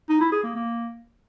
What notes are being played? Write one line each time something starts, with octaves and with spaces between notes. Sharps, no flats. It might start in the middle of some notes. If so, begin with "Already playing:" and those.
D#4
E4
G#4
A#3
A#3